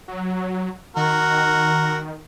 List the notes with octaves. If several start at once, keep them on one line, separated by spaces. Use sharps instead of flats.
F#3
D#3 F#4 A#4